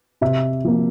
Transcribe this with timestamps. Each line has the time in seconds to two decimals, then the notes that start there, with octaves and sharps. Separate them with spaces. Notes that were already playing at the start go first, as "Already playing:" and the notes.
0.21 C3 E5
0.65 F3 A#3